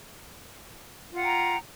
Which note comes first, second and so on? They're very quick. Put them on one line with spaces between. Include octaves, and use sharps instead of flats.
F4 F#5 G5 A#5